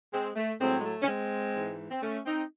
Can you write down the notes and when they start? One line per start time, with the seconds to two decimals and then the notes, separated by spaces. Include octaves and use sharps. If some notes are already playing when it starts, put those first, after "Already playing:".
0.12 G#3 C4
0.36 A3
0.60 A2 F#3 G#3 C4
0.79 G#3
0.84 A3
1.02 C#4
1.07 G#3 C4
1.54 G#2 E3
1.91 C4
2.02 A3 C#4
2.26 C4 D#4